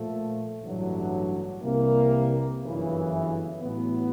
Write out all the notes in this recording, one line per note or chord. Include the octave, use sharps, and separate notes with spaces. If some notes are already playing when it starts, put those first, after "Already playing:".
Already playing: A#2 F3 A3
A1 G2 D3 F#3
C2 C3 E3 G3 A#3
G1 F#2 C#3 E3
A1 A2 F#3 B3